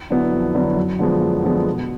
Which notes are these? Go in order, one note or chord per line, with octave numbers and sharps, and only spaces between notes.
D3 F#3 B3 E4
F2
D3 F#3 B3 E4
F#2
D3 F3 G#3 B3
F#2
D3 F3 G#3 B3
B2